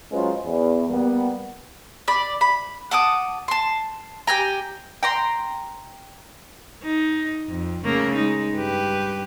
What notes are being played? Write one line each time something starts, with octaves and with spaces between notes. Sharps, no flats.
F#3 G#3 C#4 F4 B4 C5
E2
G3 A#3 B3
D5 B5
B5
F#5 A5 D6 D#6
A5 C6
G4 G5 G#5 A#5
G5 A#5 C6
D#4
F2
C#3 A3 A#3
G#3 D#4
G2 G4 B4